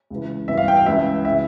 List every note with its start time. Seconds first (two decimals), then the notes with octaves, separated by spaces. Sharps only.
0.10 C#2 C#3 E3
0.48 G2 E3 E5
0.57 F5
0.68 G5
0.77 F5
0.86 C#2 C#3 E3 E5
1.25 C#3 E3 E5